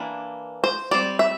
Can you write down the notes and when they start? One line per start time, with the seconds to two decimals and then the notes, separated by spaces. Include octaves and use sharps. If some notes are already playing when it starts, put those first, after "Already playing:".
Already playing: E3 A#3 D4
0.64 C5
0.91 G3 C4 D5
1.19 E5